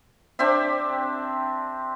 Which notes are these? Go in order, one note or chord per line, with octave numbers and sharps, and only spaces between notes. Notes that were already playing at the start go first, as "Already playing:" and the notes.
C4 D4 G4 E5